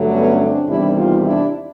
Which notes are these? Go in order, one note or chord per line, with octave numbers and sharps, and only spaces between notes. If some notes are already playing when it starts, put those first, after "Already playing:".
Already playing: G2 D3 F#3 A3
B3 C#4
C4 D4
E2 C3 D#3 G3 D4 E4
D#4 F4
D4 E4